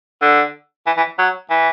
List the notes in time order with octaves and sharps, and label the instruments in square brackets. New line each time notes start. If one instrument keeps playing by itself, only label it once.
[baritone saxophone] D3
E3
E3
F#3
E3